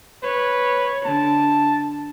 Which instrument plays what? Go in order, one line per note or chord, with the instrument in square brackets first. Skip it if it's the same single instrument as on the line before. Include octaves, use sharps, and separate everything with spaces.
[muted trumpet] B4 [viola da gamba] C#5
[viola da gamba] D3 [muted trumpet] A5